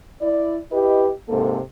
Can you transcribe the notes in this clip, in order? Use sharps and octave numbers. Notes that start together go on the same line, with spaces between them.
E4 D5
E4 G4 B4 D#5
G#2 C3 A#3 A4